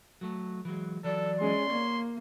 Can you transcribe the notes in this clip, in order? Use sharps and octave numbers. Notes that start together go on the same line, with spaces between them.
F#3 A3
E3 F#3 G#3
E3 F#3 A4 D5
G#3 C#4 C6
A#3 C#5